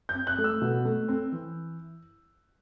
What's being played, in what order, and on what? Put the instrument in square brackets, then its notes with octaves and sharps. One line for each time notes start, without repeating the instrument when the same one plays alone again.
[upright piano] G6
C4
F#6
A3
E6
B2
A3
C4
E3